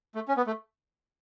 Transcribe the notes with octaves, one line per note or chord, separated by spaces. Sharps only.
A3
C#4
B3
A3